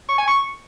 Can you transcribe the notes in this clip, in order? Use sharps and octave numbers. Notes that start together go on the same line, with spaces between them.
C#6
G#5
C#6